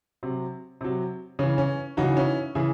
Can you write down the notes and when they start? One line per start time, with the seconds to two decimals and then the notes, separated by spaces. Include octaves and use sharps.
0.23 C3 F#3
0.81 C3 F#3
1.39 C#3 E3 C#4
1.58 C#4
1.97 C#3 E3 D#4 F#4
2.17 C#4 E4
2.55 C#3 E3 E4 G#4